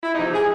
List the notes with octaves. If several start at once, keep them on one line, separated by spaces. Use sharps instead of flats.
E4
E2 C3 F3 D#4
G#4